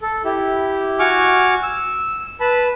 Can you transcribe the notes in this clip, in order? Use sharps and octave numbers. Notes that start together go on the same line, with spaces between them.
A4
E4 G4
F#4 G#5 C#6 D6 F6
E6
B4 A5 B5